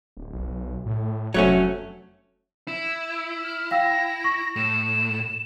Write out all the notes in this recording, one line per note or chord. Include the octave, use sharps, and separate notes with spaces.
D1
B1
A2
F1 F#3 A3 C#4
E4 E6
F6
F5 G5 E6 A#6
C#6
A2 E7